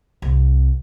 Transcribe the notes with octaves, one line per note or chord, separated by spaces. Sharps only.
C2